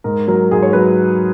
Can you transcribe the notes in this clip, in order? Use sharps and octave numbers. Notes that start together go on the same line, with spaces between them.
G#2 A#4
F#3 A#4
G#2 G#4
C#5
F#3 B4